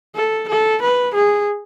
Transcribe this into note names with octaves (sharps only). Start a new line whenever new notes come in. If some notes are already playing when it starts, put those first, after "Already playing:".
A4
A4
B4
G#4